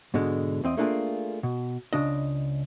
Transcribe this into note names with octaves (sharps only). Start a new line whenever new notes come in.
G#2 B2 D3 G#3
E2 C4 D#5
A3 A#3 D4 F4 G#4
B2
C#2 C#3 D4 D#5